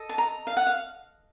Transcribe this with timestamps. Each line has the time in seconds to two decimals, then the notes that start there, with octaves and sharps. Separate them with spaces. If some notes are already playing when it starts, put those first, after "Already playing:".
Already playing: A4 D#5
0.09 A5
0.18 A#5
0.47 F5
0.57 F#5
0.67 F5